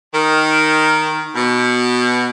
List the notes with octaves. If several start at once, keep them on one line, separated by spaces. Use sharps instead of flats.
D#3
B2